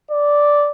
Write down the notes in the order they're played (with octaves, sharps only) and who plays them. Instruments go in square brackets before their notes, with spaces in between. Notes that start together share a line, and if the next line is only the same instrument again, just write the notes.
[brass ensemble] D5